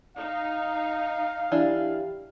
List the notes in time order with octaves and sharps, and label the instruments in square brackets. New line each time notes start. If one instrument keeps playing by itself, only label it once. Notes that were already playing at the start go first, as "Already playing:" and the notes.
[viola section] D#4 [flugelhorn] F5
[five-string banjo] E3 D4 E4 [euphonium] G4